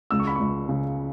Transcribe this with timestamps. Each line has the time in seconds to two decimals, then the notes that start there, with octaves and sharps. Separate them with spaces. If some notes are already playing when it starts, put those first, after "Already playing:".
0.11 C#2 E6
0.20 C#6
0.27 B5
0.35 C#2 C#6
0.69 C#3